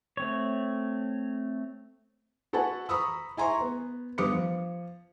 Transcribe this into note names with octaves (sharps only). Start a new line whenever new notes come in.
A3 C4 C#5
F#4 A4 B4 F#5 G#5 A5
A#5 B5 C#6 D#6 E6
E4 G#5 A#5 C6 C#6
B3
G2 G3 B3 D6 D#6 C#7
F3